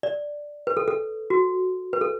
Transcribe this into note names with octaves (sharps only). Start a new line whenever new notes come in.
D5
B4
A4
A4
F#4
B4
A4